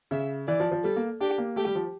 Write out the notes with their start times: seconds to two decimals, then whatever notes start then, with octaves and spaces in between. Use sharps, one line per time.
0.11 C#3 E5
0.47 E3 D5
0.60 F3
0.72 F3
0.83 G3 A4
0.96 A#3
1.20 D4 G4
1.38 A#3
1.56 A3 G4
1.66 G3
1.75 F3